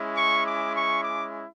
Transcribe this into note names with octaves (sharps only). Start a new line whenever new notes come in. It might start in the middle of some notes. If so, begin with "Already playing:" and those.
Already playing: G#3 C#4 E4
C#6
D6
C#6
D6